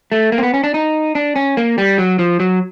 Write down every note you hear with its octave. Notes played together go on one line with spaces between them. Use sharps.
A3
A#3
C4
B3
C#4
D4
D#4
D4
C#4
A#3
G3
F#3
F3
F#3